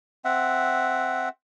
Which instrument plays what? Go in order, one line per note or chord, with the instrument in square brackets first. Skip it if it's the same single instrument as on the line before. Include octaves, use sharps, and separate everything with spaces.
[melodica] C4 E5 F#5